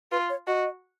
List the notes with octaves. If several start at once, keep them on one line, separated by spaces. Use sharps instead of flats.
F4 B4
C#5
F#4 D#5